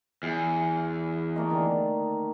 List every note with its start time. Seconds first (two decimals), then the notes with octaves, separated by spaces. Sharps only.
0.23 E2
1.36 A3 A#3 D#5
1.49 D3 D#3